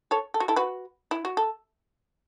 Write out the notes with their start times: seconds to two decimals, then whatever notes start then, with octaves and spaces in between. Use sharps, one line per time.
0.11 A4 C#5
0.34 A4
0.40 F#4
0.48 E4 A4
0.56 F#4 B4
1.11 E4
1.25 F#4
1.37 A4